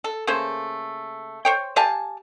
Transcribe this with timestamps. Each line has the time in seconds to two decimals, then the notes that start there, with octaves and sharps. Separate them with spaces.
0.04 A4
0.27 C#3 A3 A#3 C5
1.45 C5 C#5 G5
1.76 G4 F5 G#5 A5